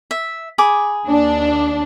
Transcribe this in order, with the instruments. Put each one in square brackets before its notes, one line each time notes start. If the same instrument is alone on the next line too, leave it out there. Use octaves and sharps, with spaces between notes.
[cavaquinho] E5
G#4 B5 D6
[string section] D#2 D4